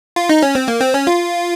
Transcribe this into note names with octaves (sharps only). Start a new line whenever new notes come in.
F4
D#4
C#4
C4
A#3
C4
C#4
F4